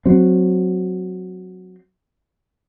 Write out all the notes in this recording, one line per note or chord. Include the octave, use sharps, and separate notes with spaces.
F#3 C4